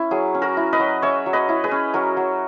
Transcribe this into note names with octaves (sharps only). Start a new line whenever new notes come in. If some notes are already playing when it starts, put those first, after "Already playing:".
Already playing: C#4 E4
F#3 G#4
C#4
F#4 A#4
E4
B4 D#5
F#3
C#4 C#5 E5
F#3
B4 D#5
E4
G#4 B4
C#4
F#3 F#4 A#4
F#3